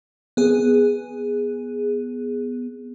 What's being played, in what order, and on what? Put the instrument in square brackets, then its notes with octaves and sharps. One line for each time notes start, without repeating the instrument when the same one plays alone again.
[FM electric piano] B3 G#4